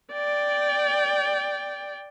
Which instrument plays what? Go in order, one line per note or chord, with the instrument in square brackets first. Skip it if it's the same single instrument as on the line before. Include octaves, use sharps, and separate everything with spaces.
[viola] D5 G5